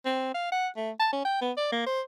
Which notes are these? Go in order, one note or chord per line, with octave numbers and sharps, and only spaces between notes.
C4
F5
F#5
A3
A5
C#4
G5
B3
D5
A#3
C5